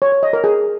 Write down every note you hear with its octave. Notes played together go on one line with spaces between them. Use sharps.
C#5
C#5
D#5
A#4
G#4